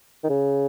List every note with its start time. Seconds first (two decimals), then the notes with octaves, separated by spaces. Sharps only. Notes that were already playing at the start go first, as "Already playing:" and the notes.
0.24 D#3
0.29 C#3